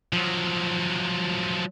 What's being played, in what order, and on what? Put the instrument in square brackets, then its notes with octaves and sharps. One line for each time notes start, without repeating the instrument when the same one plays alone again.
[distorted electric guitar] F3 F#3